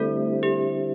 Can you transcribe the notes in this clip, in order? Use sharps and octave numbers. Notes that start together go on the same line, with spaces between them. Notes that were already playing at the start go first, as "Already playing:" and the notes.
Already playing: D3 G3 A3 C4 E4 A4
G4